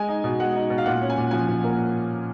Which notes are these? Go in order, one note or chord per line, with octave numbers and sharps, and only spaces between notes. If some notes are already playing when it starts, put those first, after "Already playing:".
Already playing: G#3 G#5
D#4
B2
G#3 F#5
D#4
B2
F5
A#2 F#5
C#4
G#5
A#2
F3 G#5
F3
A#3